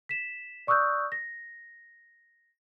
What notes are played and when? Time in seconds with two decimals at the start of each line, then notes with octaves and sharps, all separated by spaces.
0.09 B6 E7
0.67 D5 C#6 D#6 E6 F#6 G6
1.12 A#6